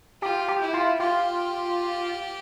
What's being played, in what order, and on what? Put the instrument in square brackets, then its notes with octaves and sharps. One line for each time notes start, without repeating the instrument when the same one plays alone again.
[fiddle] F4 [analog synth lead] G4
[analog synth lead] G4
[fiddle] E4
[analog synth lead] F4
[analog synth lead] F4 [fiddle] G4